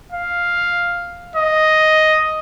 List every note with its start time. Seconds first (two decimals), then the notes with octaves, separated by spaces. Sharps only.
0.12 F5
1.36 D#5